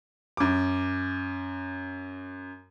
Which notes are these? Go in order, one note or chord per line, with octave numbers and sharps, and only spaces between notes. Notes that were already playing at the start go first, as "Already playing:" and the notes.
F#2 D6